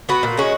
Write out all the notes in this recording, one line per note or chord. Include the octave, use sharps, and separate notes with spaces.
B3 F#4 B4
A#2
G#3 C#4 F#4